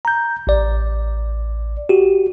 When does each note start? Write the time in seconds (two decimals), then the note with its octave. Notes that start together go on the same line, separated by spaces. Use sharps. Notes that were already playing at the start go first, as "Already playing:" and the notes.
0.05 A#5 G6
0.47 A1 D5
1.89 F#4 G4